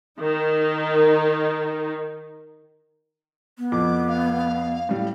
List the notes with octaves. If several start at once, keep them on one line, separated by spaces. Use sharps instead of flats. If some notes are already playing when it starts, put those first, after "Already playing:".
D#3 D#4
B3
F2 D6
F5
A2 G3